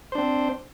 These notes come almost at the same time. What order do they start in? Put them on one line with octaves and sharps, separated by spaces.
C5 D4 C4